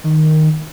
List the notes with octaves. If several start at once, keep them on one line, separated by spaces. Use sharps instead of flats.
D#3